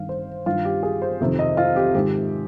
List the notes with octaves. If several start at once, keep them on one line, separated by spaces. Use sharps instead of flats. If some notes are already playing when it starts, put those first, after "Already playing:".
Already playing: G2 D#3 F5
C5
G2 D#3 F4
G4
G#4
C5
F2 C3 D#3
D#5
F4
G4
G#2 D#3 G4